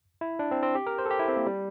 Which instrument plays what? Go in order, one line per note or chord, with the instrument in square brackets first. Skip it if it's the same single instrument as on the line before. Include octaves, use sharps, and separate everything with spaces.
[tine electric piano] E4
D4
C4
C4
G4
A#4
C5
A4
G4
E4
C4
A#3
G3